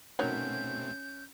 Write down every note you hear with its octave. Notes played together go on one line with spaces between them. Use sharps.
B2 D#3 F#3 A3 C4 C#4 G6